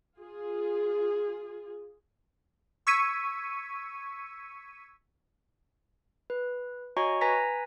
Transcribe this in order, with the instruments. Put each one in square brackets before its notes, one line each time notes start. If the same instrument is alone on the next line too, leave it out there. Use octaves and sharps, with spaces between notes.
[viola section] F4 G#4
[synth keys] C#6 E6 G#6 B6 C#7 D#7
[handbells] B4
F#4 C#5 D#5 G#5 A#5 C#6
B4 G#5 A#5 A#6 B6